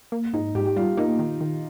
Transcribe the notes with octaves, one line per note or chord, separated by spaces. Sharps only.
A#3
G#2 D#4
G#2 G4
G4
G3 F4
A#3 D#4
D#3
D#3